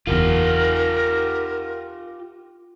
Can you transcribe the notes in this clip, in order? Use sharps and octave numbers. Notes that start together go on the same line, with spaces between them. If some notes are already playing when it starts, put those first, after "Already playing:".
F#1 E2 F4 G4 A#4